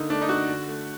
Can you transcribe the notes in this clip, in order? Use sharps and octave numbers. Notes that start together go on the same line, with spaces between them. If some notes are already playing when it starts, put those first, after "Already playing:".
Already playing: D3 A#3 D#4
A3 D4
D#4
D3 F#4
D3
A3